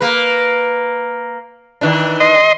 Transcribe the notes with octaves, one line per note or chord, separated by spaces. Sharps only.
A#3 B4
D#3 E3 D4
D#5 C6